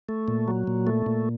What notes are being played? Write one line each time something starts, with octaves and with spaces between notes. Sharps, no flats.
A3
A#2
F#3
A#2
A3
A#2